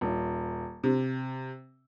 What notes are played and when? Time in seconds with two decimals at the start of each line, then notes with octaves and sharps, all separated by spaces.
0.01 D#1
0.84 C3